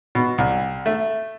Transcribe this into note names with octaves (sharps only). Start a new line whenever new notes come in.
B2
C2
A3